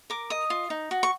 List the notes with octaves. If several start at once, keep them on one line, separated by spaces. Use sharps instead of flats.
A#4 D6
D#5 D#6
F4
D#4
F#4
C#6